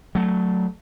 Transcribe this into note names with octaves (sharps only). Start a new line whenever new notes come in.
F#3 A3